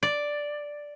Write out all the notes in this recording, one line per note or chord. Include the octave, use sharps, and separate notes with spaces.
D5